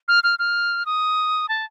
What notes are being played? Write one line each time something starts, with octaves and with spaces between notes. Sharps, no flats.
F6
F6
F6
D#6
A5